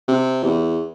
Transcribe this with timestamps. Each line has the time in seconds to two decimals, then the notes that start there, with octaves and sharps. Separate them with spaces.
0.08 C3
0.43 E2